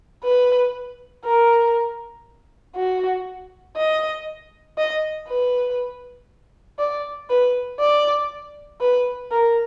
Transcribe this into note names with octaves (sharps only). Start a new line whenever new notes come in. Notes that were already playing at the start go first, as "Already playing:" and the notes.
B4
A#4
F#4
D#5
D#5
B4
D5
B4
D5
B4
A#4